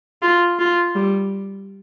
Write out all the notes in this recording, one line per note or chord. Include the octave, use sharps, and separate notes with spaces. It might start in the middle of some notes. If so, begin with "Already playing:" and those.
F4
F4
G3